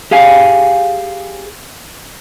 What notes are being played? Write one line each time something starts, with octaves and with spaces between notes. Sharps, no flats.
G4 G#4 F5 G#5